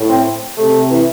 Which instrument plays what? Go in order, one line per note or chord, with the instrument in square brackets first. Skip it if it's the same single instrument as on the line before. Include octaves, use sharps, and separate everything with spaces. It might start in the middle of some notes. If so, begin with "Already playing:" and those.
Already playing: [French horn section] A2
[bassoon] C4
[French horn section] C3 [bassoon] A3
[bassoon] E3